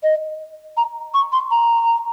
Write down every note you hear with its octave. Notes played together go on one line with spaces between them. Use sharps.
D#5
A#5
C#6
C6
A#5